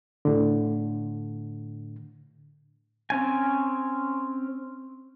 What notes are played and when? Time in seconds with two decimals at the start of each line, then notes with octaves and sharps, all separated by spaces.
0.25 A2 D3
3.10 C4 C#4 G#5